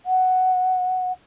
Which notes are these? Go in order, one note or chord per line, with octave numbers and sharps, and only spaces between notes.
F#5